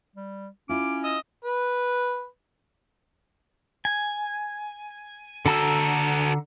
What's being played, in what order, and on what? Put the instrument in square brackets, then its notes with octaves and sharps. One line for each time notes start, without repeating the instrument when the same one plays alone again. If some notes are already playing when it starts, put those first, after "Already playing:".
[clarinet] G3
[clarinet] C#4 [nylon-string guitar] E4 F4 [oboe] D6
[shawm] D#5 [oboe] E6
[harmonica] B4
[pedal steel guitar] G#5
[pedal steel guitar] D3 A#5 E6 [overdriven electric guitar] F#4 A4